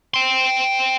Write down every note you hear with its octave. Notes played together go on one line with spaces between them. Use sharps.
G5 C6